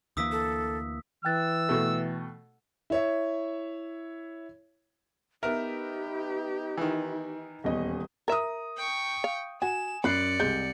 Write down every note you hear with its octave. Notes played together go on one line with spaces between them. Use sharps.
D2 E3 A#3 D#6 E6 B6
A4
E3 G5 E6 F#6 A6
B2 A3
E4 C#5 E5
B3 D#4 G4 A#4 B4 E5
D#3 E3
D#1 E2 C#4 D#5
A#4 E5 A#5 D#6
G5 C#6
F5
F#4 G#5 E7
F#2 D5 B5 F#6 C7 C#7
C2 G#3 G6